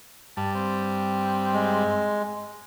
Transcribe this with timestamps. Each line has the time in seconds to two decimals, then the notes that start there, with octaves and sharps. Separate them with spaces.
0.37 G2 G3 A5
0.55 C4
1.53 G#3